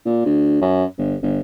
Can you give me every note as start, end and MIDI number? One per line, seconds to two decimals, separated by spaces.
0.05 0.22 46
0.26 0.57 38
0.61 0.84 42
0.98 1.15 31
1.22 1.40 31